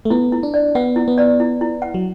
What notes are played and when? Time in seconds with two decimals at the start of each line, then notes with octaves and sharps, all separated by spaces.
0.05 A3
0.10 B3 E4
0.32 E4
0.43 D4
0.54 D5
0.75 B3 F#5
0.96 E4
1.08 B3
1.18 D5
1.40 E4
1.61 E4
1.82 F#5
1.94 F#3